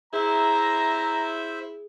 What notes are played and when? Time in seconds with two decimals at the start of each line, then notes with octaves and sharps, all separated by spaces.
0.13 E4 G#4 C5 E5 A#5